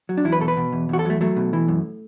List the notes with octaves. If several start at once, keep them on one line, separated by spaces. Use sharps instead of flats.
F#3
D4
E2 E4
B4
B2 A4
B4
B2
E2
E2 F#4
A4
F#3 A3
F#3 A3
B2
E3
F#2